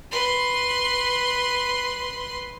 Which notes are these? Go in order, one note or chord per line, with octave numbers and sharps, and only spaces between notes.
B4 C6